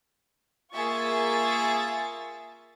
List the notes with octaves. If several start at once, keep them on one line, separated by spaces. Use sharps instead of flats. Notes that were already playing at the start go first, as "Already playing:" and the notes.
A#3 F4 G#4 E5 C#6 A6